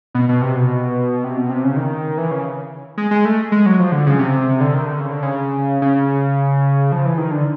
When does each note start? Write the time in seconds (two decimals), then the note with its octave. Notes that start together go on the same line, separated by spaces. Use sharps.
0.15 B2
0.29 B2
0.41 C3
0.56 B2
1.24 C3
1.37 B2
1.50 C3
1.64 C#3
1.76 D#3
2.18 E3
2.31 C#3
2.97 G#3
3.11 G#3
3.25 A3
3.52 G#3
3.66 F#3
3.79 F3
3.92 D3
4.07 C#3
4.19 C3
4.61 D3
4.74 D#3
4.86 D3
5.00 C#3
5.12 D3
5.23 C#3
5.82 C#3
6.92 F3
7.05 E3
7.18 D#3
7.31 D3